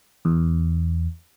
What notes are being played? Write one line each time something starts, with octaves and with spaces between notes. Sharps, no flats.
E2